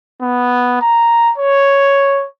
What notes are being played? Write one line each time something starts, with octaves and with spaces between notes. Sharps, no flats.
B3
A#5
C#5